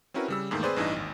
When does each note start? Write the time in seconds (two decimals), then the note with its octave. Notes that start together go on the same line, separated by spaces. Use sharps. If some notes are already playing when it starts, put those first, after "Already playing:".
0.14 C4 C#4 E4 F#4 A#4 B4
0.28 C#3 G3 E6
0.51 E2 G#2 D#3 A3 A#3
0.63 C4 G#4 B4 C5 D5
0.76 A1 G2 E3 D4 D#4 D#5
0.96 G#1 D#2